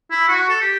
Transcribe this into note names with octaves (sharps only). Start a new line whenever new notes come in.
E4
F#4
A4
G4